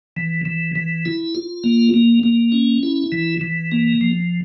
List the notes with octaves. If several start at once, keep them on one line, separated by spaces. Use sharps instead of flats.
E3
E3
E3
E4
F4
A#3
A#3
A#3
C#4
E4
E3
E3
A#3
F3